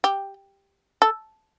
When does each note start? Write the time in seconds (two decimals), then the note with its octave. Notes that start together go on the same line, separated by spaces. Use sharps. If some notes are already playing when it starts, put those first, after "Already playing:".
0.04 G4
1.02 A4